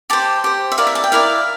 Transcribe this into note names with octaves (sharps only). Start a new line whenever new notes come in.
G4 C5 A5
G4 C5
E5
E4 A#4 D5 F5
E5
A5
G5
E4 A#4 D5 F5